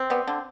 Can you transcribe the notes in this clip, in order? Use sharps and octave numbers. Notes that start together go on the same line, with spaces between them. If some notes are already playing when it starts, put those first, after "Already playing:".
Already playing: C4
G3 B3
D3